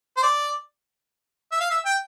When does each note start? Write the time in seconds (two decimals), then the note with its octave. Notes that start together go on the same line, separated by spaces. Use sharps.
0.17 C5
0.23 D5
1.52 E5
1.60 F5
1.70 E5
1.85 G5